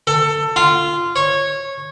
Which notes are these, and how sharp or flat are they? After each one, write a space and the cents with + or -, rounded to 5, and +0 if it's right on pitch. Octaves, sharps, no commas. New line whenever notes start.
A4 +20
F4 -15
C#5 -15